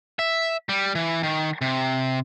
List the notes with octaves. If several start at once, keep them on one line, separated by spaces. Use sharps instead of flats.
E5
G3
E3
D#3
C3